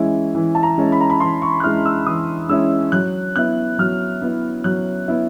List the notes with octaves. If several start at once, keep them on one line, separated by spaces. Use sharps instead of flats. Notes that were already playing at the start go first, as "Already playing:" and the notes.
Already playing: E3 G#3 C#4 E4 G#5
E3
A5
A#5
G#3 C#4 E4
B5
A#5
B5
E3 C6
C#6
F#6
G#3 C#4 E4 F6
E6
E3 D#6
G#3 C#4 E4 E6
F#3 F#6
B3 E4 F#6
F#3 F6
B3 E4
F#3 F#6
B3 E4